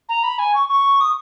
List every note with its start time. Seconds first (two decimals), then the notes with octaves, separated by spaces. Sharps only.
0.09 A#5
0.24 B5
0.39 G#5
0.55 C#6
0.69 C#6
1.01 D#6